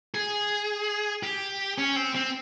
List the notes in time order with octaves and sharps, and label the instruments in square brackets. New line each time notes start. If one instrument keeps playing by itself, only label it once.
[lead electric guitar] G#4
G4
C#4
C4
C4